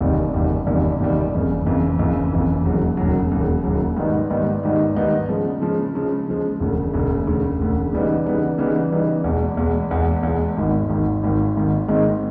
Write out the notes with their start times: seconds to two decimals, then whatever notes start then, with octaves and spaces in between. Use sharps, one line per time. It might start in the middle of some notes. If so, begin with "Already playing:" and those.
0.01 F#1 E2 C3 D#3 G3
0.34 F#1 E2 C3 D#3 G3
0.67 F#1 E2 C3 D#3 G3
1.00 F#1 E2 C3 D#3 G3
1.33 F#1 F2 C#3 E3
1.66 F#1 F2 C#3 E3
1.99 F#1 F2 C#3 E3
2.32 F#1 F2 C#3 E3
2.65 E1 D#2 C#3 F#3
2.97 E1 D#2 C#3 F#3
3.31 E1 D#2 C#3 F#3
3.64 E1 D#2 C#3 F#3
3.97 G#2 D#3 G3 B3 D#4
4.30 G#2 D#3 G3 B3 D#4
4.63 G#2 D#3 G3 B3 D#4
4.95 G#2 D#3 G3 B3 D#4
5.29 C#3 F3 G#3
5.62 C#3 F3 G#3
5.95 C#3 F3 G#3
6.27 C#3 F3 G#3
6.60 E1 D2 C#3
6.94 E1 D2 C#3
7.27 E1 D2 C#3
7.60 E1 D2 C#3
7.93 C#3 E3 G3 B3 D#4
8.25 C#3 E3 G3 B3 D#4
8.58 C#3 E3 G3 B3 D#4
8.92 C#3 E3 G3 B3 D#4
9.24 E2 B2 G#3
9.57 E2 B2 G#3
9.90 E2 B2 G#3
10.23 E2 B2 G#3
10.57 G#1 G#2 D#3
10.89 G#1 G#2 D#3
11.23 G#1 G#2 D#3
11.56 G#1 G#2 D#3
11.88 G#2 D#3 G#3 C4 D#4